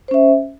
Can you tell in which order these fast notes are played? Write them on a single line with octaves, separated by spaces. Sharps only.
C5 C#4 E5